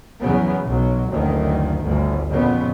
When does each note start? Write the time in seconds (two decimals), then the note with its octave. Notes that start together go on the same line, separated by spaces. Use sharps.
0.20 E2 C#3 F#3 B3
0.65 B1 F#3
1.09 F#1 D2 D#3
1.82 G1 D2
2.30 F2 A#2 C#3 B3